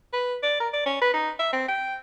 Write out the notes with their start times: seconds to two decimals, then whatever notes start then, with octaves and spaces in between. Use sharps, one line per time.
0.13 B4
0.43 D5
0.60 A#4
0.73 D5
0.86 C#4
1.01 B4
1.14 D#4
1.39 E5
1.53 C4
1.68 G5